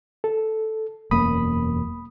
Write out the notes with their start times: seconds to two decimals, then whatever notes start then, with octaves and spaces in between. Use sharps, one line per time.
0.24 A4
1.11 E1 F#2 A#3 B5 D#6